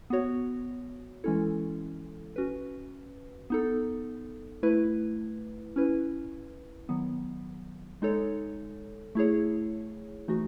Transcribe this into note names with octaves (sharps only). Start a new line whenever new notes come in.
B3 F#4 C#5
E3 G#3 C#4 E4 A4
C#4 F#4 B4
B3 D#4 A4
A3 E4 B4
C#4 E4 B4
D#3 F#3 B3
G#3 D#4 A4 C#5
A3 E4 G#4 C#5
E3 A3 D#4 F#4